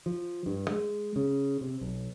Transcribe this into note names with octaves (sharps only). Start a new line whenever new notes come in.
F3
G2
G#3
C#3
C3
B1